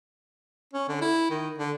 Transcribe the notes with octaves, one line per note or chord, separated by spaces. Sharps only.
C#4
D3
E4
D#3
D3